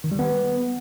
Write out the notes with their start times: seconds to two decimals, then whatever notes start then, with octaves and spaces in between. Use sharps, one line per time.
0.04 D#3
0.12 G3
0.19 B3